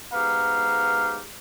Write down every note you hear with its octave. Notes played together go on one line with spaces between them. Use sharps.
G#2 B3 G4 F5 A#5